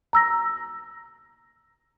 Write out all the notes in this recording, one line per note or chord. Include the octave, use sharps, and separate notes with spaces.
A#5 E6 A#6